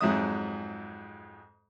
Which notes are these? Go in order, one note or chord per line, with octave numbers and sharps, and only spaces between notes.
F2 G#2 F#3 G#3 E5 D#6